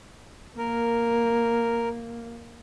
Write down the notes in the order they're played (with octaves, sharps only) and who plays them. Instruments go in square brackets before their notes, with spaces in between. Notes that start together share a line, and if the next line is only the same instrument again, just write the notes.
[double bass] A#3 [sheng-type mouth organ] A#4